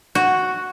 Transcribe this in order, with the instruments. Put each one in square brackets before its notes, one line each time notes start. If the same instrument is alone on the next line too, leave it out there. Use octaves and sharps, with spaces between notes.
[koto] F#4